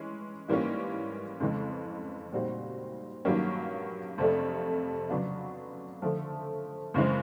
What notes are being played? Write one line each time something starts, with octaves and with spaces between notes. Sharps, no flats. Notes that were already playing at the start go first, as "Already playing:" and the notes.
Already playing: E3 G#3 C#4
G#2 E3 G3 A#3 C#4
F2 C#3 E3 G#3
A#2 G3 C4 D#4 F#4
G2 D#3 F#3 A#3 C#4
F2 C3 F3 A3 D4
C#3 F#3 B3 D4 F4
D3 F3 A3
F#2 C#3 E3 G#3 C4